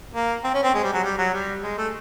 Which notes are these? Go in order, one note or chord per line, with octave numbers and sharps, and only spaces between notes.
A#3
C4
C#4
C4
G#3
G3
F#3
G3
F#3
G3
G#3
A3